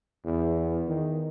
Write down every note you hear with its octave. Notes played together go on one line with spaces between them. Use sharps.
E2
D#3